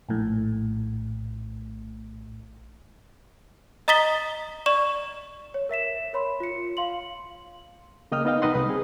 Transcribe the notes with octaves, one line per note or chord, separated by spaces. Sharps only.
A#1 A2
D#5 A#5 D#6 A6 B6 G7
D5 C#6 E7
C#5
A#4 E5 B6 E7
A#4 C#5 B5 C6
F4 C#7
F5 C6 F#7
C#3 A#3 D#5 G5 D#6 F6
B3 D#4 D#5 F5 G5
C2 D#4 B4 D#5 F#5 C6
C2 B4 B5 D#6
C4 G#4